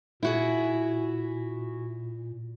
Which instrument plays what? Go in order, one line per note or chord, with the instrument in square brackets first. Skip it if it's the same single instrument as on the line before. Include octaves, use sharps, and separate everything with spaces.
[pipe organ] A#2 [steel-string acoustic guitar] E4 F#4 G#4